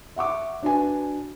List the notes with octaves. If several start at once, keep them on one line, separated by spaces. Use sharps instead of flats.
E5 F#5 C#6 D6
D4 F#4 B4 G#5